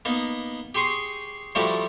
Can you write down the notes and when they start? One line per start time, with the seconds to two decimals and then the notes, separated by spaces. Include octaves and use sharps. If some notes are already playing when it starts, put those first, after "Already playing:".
0.05 A#3 B3 D#4
0.75 G4 G#4 C6 C#6 D#6
1.55 F3 G3 A3 E4 F#4 G4